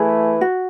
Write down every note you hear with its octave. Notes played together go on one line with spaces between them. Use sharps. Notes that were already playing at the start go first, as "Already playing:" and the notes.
Already playing: E3 A3 E4 G#4 B4
F#4